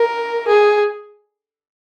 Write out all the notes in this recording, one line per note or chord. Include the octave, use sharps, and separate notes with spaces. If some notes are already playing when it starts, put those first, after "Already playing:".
Already playing: A#4
G#4